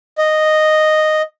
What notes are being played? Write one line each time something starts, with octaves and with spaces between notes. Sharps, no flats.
D#5